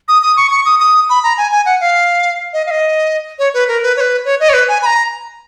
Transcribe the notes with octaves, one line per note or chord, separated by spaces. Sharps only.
D#6
D#6
C#6
C#6
D#6
D#6
B5
A#5
G#5
G#5
F#5
F5
D#5
F5
D#5
C#5
B4
A#4
B4
C#5
B4
C#5
D#5
C#5
B4
G#5
B5
A#5